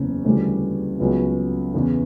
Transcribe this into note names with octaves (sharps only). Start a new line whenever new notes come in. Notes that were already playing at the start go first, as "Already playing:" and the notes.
Already playing: F#1 E2 C#3
D2 C#3 E3 G3
C#2 C#3 F#3 B3
E2 C#3 E3